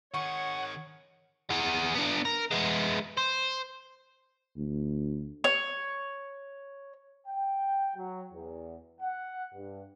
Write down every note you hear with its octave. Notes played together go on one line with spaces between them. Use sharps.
D#3 G#4 C#5 F#5 C#6
B3 G#4
D3 B3
A#4
G#3 B3
C5
D2
C#5
G5
F#3
E2
F#5
G2